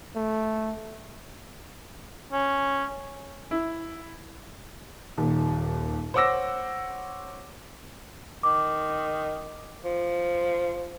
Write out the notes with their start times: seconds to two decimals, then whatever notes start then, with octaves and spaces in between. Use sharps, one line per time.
0.16 A3
2.32 C#4
3.51 E4
5.18 D#1 D#2
6.14 C5 C#5 F#5 D6 E6 A#6
8.43 D#3 D6
9.85 F3